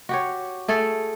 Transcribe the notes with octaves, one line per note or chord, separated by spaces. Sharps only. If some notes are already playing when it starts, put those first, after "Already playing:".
F#4 G4 C#5
A3 G#4 A4